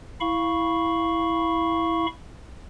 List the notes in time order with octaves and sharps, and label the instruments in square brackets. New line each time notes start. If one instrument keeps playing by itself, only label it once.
[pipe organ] E4 F5 B5 C#6